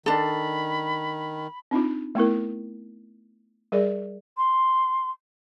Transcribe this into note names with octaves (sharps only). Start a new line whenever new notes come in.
D#3 D4 A4 B5
C4 D4 D#4 F4
A3 B3 E4 A#4
G3 G#4 A#4 D5
C6